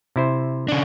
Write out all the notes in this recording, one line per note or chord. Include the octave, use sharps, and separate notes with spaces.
C3 E4 C5
C#3 D4